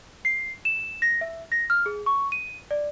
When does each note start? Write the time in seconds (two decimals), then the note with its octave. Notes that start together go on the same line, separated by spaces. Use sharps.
0.25 C7
0.65 E7
1.02 A#6
1.21 E5
1.52 A#6
1.70 F6
1.86 G#4
2.06 C#6
2.32 D#7
2.71 D5